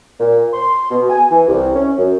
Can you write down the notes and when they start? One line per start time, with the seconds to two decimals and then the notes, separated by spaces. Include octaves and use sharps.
0.19 A#2
0.54 C6
0.90 B2
1.10 G#5
1.31 E3
1.48 C2
1.74 C#4
1.98 F#2